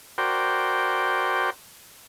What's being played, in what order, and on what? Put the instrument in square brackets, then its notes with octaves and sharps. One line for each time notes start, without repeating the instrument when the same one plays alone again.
[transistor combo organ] F#4 A#4 C5 D5 G5